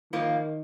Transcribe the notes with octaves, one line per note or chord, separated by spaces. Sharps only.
D#3 F3 A#3